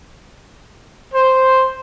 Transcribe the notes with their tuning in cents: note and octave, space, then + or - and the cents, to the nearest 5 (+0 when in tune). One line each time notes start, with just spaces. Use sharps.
C5 +0